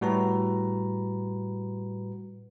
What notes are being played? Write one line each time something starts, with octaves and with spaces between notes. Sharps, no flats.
A2 G3 F#4 B4 A#5